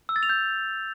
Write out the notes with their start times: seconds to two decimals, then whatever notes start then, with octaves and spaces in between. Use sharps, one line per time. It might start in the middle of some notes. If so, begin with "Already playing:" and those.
0.09 E6
0.16 A6
0.23 F7
0.29 G6